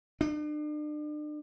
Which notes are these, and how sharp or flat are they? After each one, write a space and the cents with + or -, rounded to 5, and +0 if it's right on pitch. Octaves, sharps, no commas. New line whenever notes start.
D4 +40